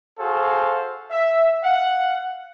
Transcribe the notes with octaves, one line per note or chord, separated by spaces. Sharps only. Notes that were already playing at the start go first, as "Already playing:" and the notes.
F#4 G#4 A4 C5 F5
E5
F5 F#5